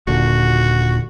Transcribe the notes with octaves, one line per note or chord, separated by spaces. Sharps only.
D#1 A#2 D3 F#4